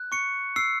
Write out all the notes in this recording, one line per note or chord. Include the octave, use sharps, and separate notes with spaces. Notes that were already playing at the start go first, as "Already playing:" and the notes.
Already playing: F#6
C#6 C#7
E6 C7